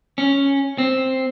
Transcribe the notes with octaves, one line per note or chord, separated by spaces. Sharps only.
C#4
C4